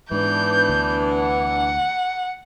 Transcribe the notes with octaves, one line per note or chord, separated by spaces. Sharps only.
G#2 E3 B3 D4 G6
D2
F#5